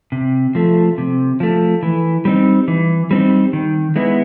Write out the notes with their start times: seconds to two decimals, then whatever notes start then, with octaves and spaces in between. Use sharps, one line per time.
0.12 C3
0.55 F3 A3
0.98 C3
1.40 F3 A3
1.83 E3
2.25 G3 C4 D#4
2.68 E3
3.11 G3 C4 D#4
3.53 D#3
3.96 G#3 B3 E4